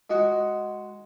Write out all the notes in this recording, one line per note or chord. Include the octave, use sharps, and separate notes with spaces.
G#3 F#4 D#5